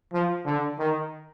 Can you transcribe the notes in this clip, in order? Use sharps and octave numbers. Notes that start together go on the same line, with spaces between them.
F3
D3
D#3